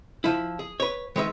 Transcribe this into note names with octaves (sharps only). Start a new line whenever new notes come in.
F3 E4
G#4
B4 C#5
D#3 G#3 B4 E5